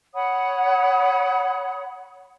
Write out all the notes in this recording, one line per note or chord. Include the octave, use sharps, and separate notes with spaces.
C#5 F#5 B5 D#6